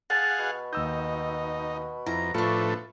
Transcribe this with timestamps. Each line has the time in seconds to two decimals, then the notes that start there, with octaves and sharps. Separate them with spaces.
0.10 G#4 F5 F#5 A5
0.39 B2
0.73 D#2 D#4 E6 G6
2.06 F2 E4 A#5
2.34 A2 F3 A3 D4 F4 B4 C#6